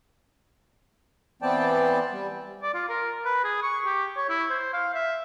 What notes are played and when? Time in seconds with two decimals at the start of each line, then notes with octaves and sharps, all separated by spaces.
1.42 E3 B3 C4 D5 G5 A5
2.12 G3
2.62 D5
2.74 F4
2.89 A#4
3.25 B4
3.44 G#4
3.63 C#6
3.86 G4
4.17 C#5
4.30 E4
4.50 C5
4.73 F5
4.94 E5